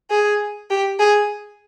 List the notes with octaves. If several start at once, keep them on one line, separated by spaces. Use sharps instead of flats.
G#4
G4
G#4